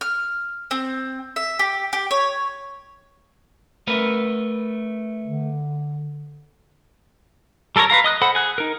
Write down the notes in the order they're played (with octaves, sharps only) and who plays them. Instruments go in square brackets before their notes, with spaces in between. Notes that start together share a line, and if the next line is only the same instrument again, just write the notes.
[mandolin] F6
C4
E5
G4
G4
C#5
[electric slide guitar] A3 A#4 B4
[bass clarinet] D3
[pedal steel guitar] G3 A4 A#4 C#5 A#5
B4 C#5 F5 A#5
D#5 D#6 F#6
A4 C5 F#5 B5
G#4 F#6
D#4 A#4